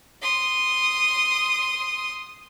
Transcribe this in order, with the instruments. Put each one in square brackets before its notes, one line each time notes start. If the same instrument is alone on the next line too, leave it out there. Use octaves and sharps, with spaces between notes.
[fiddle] C6 D#6